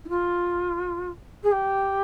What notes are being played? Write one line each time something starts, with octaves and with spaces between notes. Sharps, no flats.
E4
F4
G#4
G4